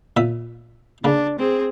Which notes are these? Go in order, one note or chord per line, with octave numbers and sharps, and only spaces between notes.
A#2 E5 D#6
C#3 A#3 D4
C4 G#4